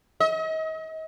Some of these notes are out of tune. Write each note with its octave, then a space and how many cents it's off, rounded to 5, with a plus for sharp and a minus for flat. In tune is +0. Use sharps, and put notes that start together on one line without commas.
D#5 +35